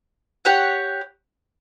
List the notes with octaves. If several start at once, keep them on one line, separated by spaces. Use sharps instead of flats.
G4 C#5 F#5